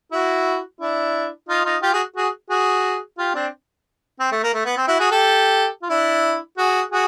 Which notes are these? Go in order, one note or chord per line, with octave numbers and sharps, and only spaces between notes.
E4 F#4
D4 E4
D#4 F4
D#4 F4
F4 G4
F#4 G#4
F#4 G#4
F#4 G#4
F4 G4
C4 D4
C4
A3
A#3
A3
B3
C4
E4 F#4
F#4 G#4
G4 A4
F4
D4 E4
F#4 G#4
F#4 G#4